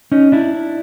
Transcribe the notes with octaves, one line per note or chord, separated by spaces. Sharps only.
C#4 D#4
D4 E4